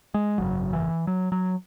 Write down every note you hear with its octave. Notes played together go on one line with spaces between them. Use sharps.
G#3
G#1 F#2 C#3 F#3
E3
F#3
F#3